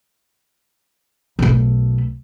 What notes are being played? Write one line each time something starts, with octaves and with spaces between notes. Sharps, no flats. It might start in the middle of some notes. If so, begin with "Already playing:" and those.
B1 A3